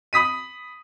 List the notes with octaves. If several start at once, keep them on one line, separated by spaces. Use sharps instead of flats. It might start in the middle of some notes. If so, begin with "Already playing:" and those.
B5 D#6 B6 D#7